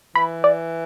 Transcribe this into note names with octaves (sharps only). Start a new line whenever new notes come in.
E3 B5
D5